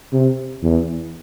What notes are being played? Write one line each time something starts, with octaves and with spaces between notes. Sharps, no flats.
C3
E2